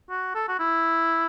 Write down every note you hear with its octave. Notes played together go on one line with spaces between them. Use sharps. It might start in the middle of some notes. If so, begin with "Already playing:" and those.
F#4
A4
F#4
E4